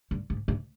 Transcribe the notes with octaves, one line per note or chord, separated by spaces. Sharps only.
G2
G#2
G#2